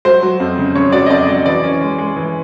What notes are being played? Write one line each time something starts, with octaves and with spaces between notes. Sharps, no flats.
F#3 C5
F#3
F2
C#3
C#3 C#5
F#3 D5
D#5
F2 D5
F#3 D#5
E3 D5
C#4
G#3
G#3
E3